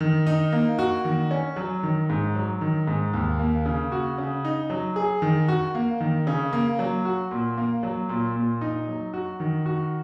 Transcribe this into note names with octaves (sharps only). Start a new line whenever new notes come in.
D#3
D#4
A#3
F#4
D#3
C#4
F#3
D#3
G#2
F#3
D#3
G#2
D#2
A#3
C#3
F#4
C#3
D#4
F#3
G#4
D#3
F#4
A#3
D#3
C#3
A#3
F#3
F#4
A#2
A#3
F#3
A#2
A#2
D#4
F#3
F#4
D#3
F#4